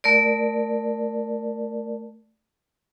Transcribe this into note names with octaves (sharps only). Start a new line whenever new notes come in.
A3 A#4 D5